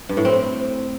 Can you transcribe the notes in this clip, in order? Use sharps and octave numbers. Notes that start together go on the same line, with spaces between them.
G2
A2
C4